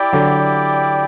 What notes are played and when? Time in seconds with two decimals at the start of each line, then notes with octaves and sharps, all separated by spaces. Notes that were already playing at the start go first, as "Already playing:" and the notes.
Already playing: E4 G4 D5 G5
0.13 D3 F#3